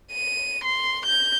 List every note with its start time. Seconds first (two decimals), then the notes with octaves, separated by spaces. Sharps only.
0.12 D#7
0.64 C6
1.06 G6